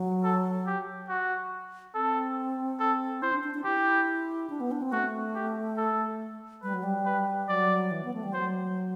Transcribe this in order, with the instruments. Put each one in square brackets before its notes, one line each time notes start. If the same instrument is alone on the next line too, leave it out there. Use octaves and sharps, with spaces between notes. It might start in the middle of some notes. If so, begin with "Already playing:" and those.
Already playing: [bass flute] F#3
[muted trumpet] A4
G4
F#4
[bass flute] C4 [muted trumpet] A4
[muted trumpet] A4
[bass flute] E4 [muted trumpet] C5
[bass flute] D4
D4
D4
[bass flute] E4 [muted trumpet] G4
[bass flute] D4
B3
D4
C4
[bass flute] A3 [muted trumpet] F#4
[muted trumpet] G4
A4
[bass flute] G3 [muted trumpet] B4
[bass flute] F#3
G3
[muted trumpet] B4
[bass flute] F#3 [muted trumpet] D5
[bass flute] E3
B3
A3
G3
[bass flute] F#3 [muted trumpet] C5